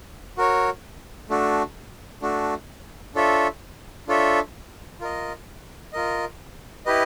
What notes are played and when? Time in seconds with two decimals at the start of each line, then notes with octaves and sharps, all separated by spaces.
0.37 F#4 A#4 C#5
1.30 A3 D4 F#4
2.22 A3 D4 F#4
3.15 D4 F4 A4 C#5 E5
4.08 D4 F4 A4 C#5 E5
5.00 F4 A#4 D#5
5.93 F4 A#4 D#5
6.86 E4 G4 B4 D#5